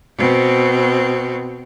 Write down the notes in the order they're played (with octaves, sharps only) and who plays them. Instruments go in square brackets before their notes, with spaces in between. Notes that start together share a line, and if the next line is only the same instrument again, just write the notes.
[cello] B2 C4